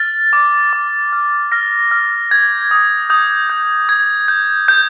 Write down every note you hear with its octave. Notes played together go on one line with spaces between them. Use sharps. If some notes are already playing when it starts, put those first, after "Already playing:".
Already playing: F6 A6
D6
D6
F6
F6 A#6
F6
G6 G#6
D#6
D#6 G6
G6
D#6 G#6
G6
G6